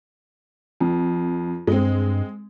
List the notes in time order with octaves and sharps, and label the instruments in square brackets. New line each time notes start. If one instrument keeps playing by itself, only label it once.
[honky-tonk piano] F2
[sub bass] G2 [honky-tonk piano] G#3 C4